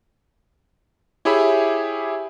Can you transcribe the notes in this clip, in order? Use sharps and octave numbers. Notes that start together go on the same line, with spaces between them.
E4 G4 G#4 C#5 E5 B5